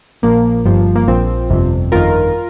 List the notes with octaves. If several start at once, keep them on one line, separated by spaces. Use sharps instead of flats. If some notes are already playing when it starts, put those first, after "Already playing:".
A#1 A#2 F3 A#3
G1 G2 F3
A#3
A#1 A#2 F3 C4
G1 F2 C3
G1 F2 D#3 F4 A#4